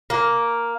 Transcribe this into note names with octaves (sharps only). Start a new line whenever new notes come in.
A#3